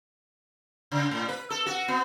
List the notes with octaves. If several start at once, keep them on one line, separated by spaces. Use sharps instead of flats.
C#3
A2
B4
A4
F#4
B3